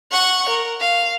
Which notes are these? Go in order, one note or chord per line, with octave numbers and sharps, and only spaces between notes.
F#5 C#6
A#4
F5